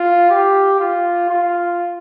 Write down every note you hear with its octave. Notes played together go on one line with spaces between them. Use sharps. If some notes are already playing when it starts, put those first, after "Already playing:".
Already playing: F4
G4
F4
F4